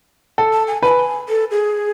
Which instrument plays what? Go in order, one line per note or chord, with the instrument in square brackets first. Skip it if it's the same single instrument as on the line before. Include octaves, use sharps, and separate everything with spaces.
[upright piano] A4
[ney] A5
G#5
[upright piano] B4 [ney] A5
[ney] G#5
A4
G#4